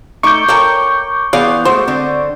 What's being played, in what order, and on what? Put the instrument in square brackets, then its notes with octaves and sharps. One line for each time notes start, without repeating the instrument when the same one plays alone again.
[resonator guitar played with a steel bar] A3 D#4 [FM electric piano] C#6 D6 G6
[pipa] A#3 A4 G5 [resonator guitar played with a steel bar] A#4 C#5
[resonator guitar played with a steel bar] E3 B3 F4 [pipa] G#4 D5 F5
[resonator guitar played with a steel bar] G#3 A3 F#4 [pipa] C5
[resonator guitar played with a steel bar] D3 C4